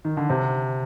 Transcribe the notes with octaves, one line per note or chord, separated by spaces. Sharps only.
D#3
D3
C3